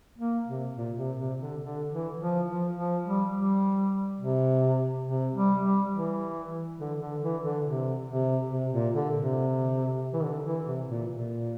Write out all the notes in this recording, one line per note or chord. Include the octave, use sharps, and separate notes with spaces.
A#3
C3
A#2
C3
C3
D3
D3
E3
F3
F3
F3
G3
G3
C3
C3
G3
G3
E3
D3
D3
E3
D3
C3
C3
C3
A#2
D3
C3
E3
D3
E3
C3
A#2
A#2